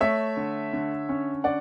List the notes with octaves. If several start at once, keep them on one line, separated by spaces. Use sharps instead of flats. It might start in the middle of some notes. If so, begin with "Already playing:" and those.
A3 C#5 E5
D3
D3
C#4
D3 D5 F#5